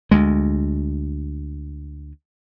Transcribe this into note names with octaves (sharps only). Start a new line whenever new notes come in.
D2 G#3